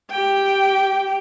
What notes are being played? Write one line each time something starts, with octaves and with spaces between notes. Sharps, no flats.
G4 G5